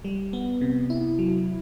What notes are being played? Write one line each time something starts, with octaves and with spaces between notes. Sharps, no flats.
G3
B3
C3
E4
F#3